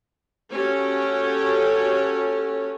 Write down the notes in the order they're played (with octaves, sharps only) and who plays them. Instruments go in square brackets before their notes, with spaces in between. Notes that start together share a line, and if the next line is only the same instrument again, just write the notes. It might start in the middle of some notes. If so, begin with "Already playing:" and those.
[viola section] C#4 F#4 G4 A4 C#5